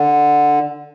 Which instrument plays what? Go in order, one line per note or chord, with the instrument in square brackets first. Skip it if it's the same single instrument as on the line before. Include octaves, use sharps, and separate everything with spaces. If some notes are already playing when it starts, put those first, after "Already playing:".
Already playing: [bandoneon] D3